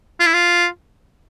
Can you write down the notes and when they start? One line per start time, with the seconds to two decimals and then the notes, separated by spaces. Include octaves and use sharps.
0.20 F4
0.27 E4
0.34 F4